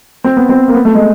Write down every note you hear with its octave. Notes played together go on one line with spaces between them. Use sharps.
C4
B3
C4
A#3
B3
A3
G#3